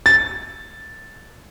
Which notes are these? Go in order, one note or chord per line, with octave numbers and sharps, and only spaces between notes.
A6